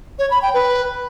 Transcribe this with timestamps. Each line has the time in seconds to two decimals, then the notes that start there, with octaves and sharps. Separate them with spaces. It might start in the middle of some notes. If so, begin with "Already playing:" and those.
0.19 C#5
0.31 B5
0.42 G5
0.54 B4